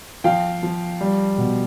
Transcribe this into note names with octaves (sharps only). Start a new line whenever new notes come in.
F3 F5 G5
F3
G3
B2